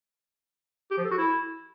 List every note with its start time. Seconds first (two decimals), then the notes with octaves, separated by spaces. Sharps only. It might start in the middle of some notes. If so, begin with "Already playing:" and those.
0.91 G4
0.98 F3
1.04 A4
1.11 F#4
1.18 E4